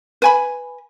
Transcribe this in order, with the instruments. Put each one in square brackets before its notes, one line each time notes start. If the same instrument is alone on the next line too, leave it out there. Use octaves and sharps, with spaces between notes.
[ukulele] B4 G#5 B5